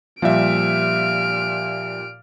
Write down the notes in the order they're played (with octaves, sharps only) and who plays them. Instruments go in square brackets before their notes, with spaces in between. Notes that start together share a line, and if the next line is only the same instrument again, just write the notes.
[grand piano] A#2 G3 [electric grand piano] F3 E5 [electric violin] F6 D7